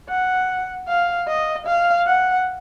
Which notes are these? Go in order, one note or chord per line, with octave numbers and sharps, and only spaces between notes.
F#5
F5
D#5
F5
F#5